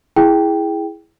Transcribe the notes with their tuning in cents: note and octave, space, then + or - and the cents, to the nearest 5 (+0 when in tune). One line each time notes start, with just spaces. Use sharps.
E4 +0 G#4 +0 G5 +0